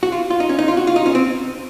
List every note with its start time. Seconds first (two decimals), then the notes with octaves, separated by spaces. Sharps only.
0.03 F#4
0.12 F4
0.31 F4
0.40 D#4
0.49 C#4
0.59 D#4
0.68 F4
0.77 F#4
0.87 F4
0.96 D#4
1.06 C#4
1.15 C4